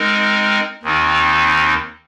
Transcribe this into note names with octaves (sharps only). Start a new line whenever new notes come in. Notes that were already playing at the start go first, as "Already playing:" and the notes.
Already playing: G#3 C4 D#4 A#4
D#2 D#3 C4 D#4